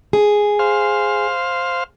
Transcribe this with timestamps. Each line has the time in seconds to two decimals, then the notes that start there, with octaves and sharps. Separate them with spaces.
0.13 G#4
0.59 C5 F5